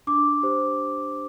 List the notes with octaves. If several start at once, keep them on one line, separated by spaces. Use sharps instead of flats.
D4 D6
G4 C5